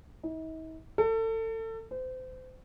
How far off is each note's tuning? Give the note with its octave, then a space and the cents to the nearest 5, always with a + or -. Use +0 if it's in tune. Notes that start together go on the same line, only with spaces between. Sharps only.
D#4 +45
A4 +30
C5 -30